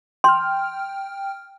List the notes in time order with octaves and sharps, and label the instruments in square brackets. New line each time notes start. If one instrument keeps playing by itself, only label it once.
[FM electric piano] G5 F6 [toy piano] C6